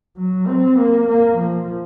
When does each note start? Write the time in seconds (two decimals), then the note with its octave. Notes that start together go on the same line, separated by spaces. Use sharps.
0.17 F#3
0.47 C4
0.77 A#3
1.08 A#3
1.38 F3